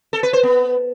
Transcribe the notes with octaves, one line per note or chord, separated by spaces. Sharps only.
A4
B4
C5
B3